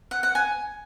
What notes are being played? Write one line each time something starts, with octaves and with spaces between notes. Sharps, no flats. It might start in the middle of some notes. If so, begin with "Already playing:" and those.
F#5
F#5
G#5